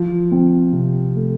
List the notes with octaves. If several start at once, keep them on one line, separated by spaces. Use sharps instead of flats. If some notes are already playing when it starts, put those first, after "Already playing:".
Already playing: F3
C4
C3
A3